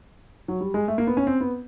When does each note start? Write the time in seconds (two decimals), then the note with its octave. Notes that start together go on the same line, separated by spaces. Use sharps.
0.48 F#3
0.61 G3
0.74 G#3
0.88 A3
0.98 A#3
1.07 B3
1.17 C#4
1.27 C4
1.41 B3